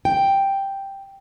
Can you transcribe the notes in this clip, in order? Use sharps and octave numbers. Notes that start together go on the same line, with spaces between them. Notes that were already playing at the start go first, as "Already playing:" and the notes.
G5